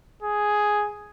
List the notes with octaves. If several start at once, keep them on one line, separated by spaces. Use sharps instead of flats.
G#4